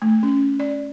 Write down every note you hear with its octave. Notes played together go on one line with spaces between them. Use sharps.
A3
C#4
D5